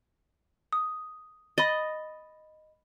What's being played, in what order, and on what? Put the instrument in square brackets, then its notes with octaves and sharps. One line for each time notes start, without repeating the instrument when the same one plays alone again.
[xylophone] D#6
[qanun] D#5 [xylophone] B5 A6